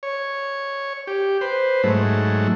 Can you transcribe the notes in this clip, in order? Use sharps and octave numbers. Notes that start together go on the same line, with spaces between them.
C#5
G4
B4 C5
G#2 F#3 A3